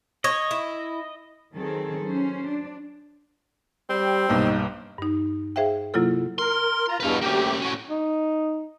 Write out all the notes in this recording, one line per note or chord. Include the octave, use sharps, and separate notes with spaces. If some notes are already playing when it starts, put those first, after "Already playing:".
C#5 D#5
E4
D#3 F#3 C4 G#4 A4
F#3 C#4 C5
D4
G3 C4
B1 G2 A#3 D#4
G2 D#4
G#4 C5 E5 F5 G5
C3 F#3 A#3 E4 F4 A4
A#4 C6
F4 A#5
E2 G2 B2 B4 F5
D2 A#3 C#4 G4
A2 C#4 F#4
D#4